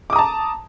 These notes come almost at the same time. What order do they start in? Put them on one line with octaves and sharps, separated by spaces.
D6 D#6 A#5 A5